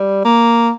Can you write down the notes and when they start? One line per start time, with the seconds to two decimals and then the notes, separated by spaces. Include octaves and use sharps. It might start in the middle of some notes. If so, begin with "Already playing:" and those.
Already playing: G3
0.24 A#3